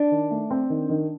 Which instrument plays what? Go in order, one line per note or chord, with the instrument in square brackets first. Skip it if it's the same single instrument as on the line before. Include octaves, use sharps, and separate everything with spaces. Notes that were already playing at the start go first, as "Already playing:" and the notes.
Already playing: [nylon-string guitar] D4
[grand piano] D#3
A3
C4
D#3
D#3